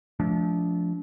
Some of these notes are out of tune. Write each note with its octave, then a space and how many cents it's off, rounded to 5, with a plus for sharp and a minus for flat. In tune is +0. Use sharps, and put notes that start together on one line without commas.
F3 -5 A3 -35 D4 -25